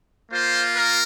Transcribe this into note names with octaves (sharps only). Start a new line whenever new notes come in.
A#3 F4 C5
A#4